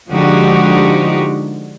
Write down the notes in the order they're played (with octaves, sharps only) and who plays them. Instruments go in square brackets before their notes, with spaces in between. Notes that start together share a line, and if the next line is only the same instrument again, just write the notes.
[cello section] D3 F3 G#3 D#4 F#4 G4